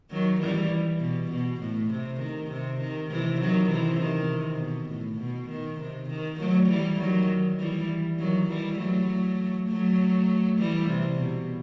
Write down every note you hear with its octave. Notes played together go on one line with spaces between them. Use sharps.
D#3 F#3
E3 G3
B2
B2
A2
C3
D#3
C3
D#3
C3 E3
D#3 F#3
C3 E3
D#3
C3
B2
A2
B2
D#3
C3
D#3
F#3 A3
E3 G3
D#3 F#3
E3 G3
D#3 F#3
E3 G3
F#3 A3
F#3 A3
E3 G3
C3
B2